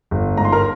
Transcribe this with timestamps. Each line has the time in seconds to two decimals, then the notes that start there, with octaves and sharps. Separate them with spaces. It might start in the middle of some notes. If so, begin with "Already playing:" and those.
0.11 G1
0.37 G#2 A#5
0.45 C6
0.52 A#4 A#5